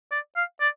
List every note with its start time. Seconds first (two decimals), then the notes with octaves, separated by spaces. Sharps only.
0.12 D5
0.36 F5
0.61 D5